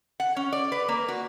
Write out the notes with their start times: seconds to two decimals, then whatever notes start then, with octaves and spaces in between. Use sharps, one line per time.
0.20 F#5
0.36 C#4
0.53 D5
0.72 B4
0.88 A#3
1.08 F#4